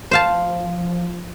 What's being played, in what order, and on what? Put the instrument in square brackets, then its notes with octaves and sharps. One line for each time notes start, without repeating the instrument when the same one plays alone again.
[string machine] F3 [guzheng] C5 F5 A5